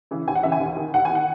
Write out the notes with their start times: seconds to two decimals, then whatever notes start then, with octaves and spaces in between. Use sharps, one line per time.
0.11 C#3 E3
0.27 D#2 G#5
0.35 F#5
0.43 C#3 E3 E5
0.52 G#5
0.60 D#2
0.77 D#3
0.94 D#2 F#5
1.05 G#5
1.10 D#3 F#5